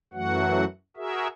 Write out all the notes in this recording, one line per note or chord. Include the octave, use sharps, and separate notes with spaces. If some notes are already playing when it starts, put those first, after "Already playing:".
F#2 E3 F#3 A3 F#4 F#5
F#4 G#4 A#4 E5